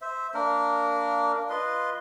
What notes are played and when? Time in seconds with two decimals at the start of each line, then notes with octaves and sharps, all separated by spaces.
0.02 C5 E5
0.34 A#3 D4 A#4
1.36 D4
1.50 F4 B4 D#5 C6